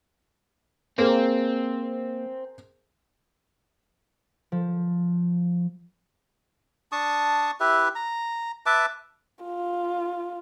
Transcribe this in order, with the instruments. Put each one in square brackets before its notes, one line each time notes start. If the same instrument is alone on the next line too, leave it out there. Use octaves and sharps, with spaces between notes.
[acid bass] A#3 [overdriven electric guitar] C4 [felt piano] G#4 A#4 C5
[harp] F3
[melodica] D4 A5 C#6 D#6
E4 G4 B4 E5
A#5
B4 E5 A5 D6
[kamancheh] F4